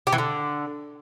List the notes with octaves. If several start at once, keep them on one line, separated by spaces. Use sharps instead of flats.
G4
E3
D3